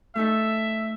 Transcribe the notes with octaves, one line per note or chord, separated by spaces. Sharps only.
A3 D#4 A4 E5